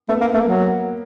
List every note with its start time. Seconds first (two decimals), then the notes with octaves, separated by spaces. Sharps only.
0.09 A3 B3
0.21 A#3 B3
0.34 A3 A#3
0.45 F#3